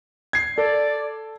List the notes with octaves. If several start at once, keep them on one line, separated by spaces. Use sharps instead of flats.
G#6 C7
A4 D5